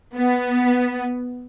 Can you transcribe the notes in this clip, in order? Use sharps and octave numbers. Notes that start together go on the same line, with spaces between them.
B3